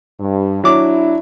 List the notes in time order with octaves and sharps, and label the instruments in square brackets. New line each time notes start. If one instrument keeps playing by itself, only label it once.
[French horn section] G2
[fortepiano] F#3 D6 [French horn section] D4 E4